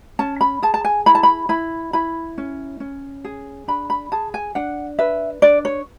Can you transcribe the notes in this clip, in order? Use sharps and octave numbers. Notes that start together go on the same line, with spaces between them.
C#4 A5
B5
G#4 A5
A5
G#5
E4 B5
A5
B5
E4 B5
E4 B5
C#4
C#4
G#4
D4 B5
B5
G#4 A5
G#5
D4 F#5
B4 E5
D4 D5
C#5